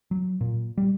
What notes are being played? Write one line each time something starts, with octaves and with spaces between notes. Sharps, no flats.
F#3
A#2
G3